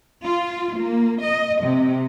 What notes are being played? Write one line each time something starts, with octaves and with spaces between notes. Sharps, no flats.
F4
A#3
D#5
C3